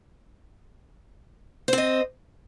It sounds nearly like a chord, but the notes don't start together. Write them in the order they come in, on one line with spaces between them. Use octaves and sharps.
C5 C4 D#5